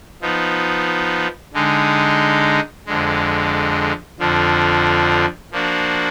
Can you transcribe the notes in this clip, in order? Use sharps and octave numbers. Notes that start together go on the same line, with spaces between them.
F3 B3 D#4
D3 G#3 D#4
F2 D3 G#3
F2 D3 F3
F3 A#3 D4 F#4